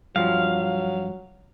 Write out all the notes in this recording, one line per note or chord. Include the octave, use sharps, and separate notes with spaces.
G2 F3 F#3 F5